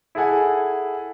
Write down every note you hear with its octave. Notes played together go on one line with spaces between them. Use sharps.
E4 G#4 A4 F#5 G#5